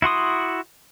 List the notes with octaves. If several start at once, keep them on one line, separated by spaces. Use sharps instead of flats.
E4 F#4 C6 D#6